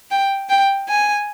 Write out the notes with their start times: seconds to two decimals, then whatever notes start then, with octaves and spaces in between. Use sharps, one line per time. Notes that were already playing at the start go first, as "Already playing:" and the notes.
0.11 G5
0.49 G5
0.88 G#5